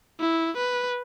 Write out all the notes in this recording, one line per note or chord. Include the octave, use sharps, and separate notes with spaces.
E4
B4